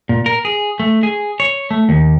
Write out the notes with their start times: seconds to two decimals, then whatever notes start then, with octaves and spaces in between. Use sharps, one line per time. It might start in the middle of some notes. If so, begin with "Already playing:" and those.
0.09 A#2
0.26 A#4
0.45 G#4
0.80 A3
1.03 G#4
1.40 C#5
1.71 A3
1.89 D#2